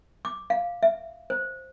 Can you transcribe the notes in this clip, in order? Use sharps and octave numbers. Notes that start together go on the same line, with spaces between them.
D6
F5
E5
C5